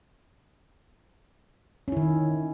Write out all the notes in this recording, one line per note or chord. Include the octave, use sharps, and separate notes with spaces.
D#3 C#4 E4